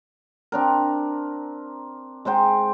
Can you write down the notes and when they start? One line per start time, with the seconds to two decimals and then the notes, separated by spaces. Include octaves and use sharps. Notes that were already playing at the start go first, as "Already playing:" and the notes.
0.52 C4 D4 A#4
2.25 G#3 D#4 C5 G5